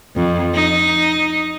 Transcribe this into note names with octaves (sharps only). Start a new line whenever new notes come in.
F2
D#4